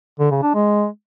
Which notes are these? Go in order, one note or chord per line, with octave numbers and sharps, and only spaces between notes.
D3
C#3
D4
G#3